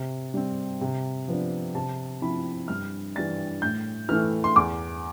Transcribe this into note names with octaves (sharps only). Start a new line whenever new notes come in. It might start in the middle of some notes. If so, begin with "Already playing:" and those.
Already playing: C3
G3 C4
C3
F3 B3 D4
C3 A5
F3 C4 E4 B5
G2 F6
E3 G3 D4 A6
A2 G6
E3 A3 E4 F6
C6
E2 D6